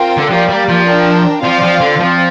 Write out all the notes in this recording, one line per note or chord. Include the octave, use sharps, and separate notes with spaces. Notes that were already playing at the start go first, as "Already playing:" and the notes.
Already playing: C4 F4 A#4 G5
D3
F3 A#3 G4 D5
G3
F3
D4 A#4 G5
F3 C4 F4 D5 F5
F3
D3
F3 C4